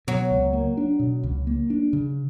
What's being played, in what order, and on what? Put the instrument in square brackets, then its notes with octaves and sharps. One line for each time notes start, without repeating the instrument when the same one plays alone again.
[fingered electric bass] B2 [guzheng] F#3
[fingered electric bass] C#2
A#3
D4
B2
C#2
A#3
D4
C#3